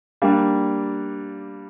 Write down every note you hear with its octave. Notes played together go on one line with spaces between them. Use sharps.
G3 A#3 D4